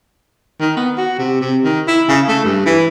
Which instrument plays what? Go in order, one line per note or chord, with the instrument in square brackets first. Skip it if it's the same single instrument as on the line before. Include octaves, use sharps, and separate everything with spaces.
[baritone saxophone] D#3
B3
F#4
C3
C3
D#3
E4
C#3
A3
G2
E3